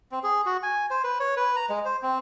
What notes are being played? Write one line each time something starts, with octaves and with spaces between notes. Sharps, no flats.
C4
G#4
F#4
G#5
C5
B4
C#5
B4
A#5
G#3
C5
C4